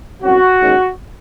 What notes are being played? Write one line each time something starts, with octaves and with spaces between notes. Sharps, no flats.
C2 C3 F#3 C#4 F#4
D#2 D#3 G#3 C#4